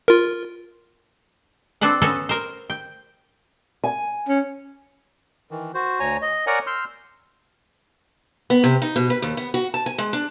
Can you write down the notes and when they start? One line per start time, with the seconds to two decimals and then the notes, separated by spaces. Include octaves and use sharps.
0.08 F4 A#4
1.81 C4 D4 A4 B4 F#5
2.01 B3 C#4 F#4 A4 B4
2.29 A#4 C5
2.70 G5
3.84 G#5
4.28 C#4
5.51 D#3 E3
5.74 F#4 C5
6.00 D2 C#5 G#5 A#5
6.22 D#5
6.47 A#4 C#5 D5 F#5 G#5 A#5
6.67 C6 E6 F6 G6
8.50 B3
8.64 C3
8.82 D#4
8.96 B2
9.10 B4
9.22 D#2
9.37 B3
9.54 F#4
9.74 A5
9.86 G#5
9.98 G#3
10.13 D4